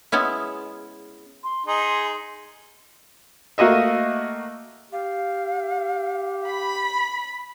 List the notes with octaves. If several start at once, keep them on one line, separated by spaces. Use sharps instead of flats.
G#3 B3 C#4 E4
C6
D#4 G#4 C6
A3 A#3 F#4 D#5 E5
G4 F5
B5